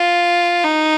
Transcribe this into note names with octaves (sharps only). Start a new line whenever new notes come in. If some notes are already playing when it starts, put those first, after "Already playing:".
Already playing: F4
D#4